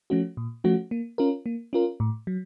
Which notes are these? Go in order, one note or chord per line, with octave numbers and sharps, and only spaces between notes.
F3 A3 C#4 F#4
A#2
F3 A3 C#4 F#4
A#3
C#4 F4 A#4
A#3
C#4 F4 A#4
A2
F#3